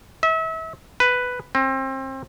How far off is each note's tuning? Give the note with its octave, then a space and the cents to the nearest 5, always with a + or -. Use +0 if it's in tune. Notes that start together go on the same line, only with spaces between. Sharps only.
E5 -35
B4 +5
C4 +30